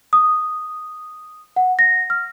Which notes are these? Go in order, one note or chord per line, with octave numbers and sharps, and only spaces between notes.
D#6
F#5
A#6
F6